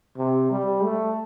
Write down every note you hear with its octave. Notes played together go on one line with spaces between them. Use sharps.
C3
G3
A3